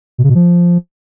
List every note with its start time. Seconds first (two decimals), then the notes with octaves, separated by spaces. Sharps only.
0.18 B2
0.24 C#3
0.29 B2
0.35 F3